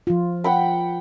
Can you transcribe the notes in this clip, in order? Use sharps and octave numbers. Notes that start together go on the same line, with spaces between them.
F3 F4
F#5 G5 B5